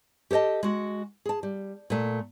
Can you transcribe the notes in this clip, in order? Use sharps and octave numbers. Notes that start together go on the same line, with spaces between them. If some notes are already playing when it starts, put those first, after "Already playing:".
G4 A4 C#5 D#5 A5
G#3 F#4
G#4 A5
G3
A#2 A3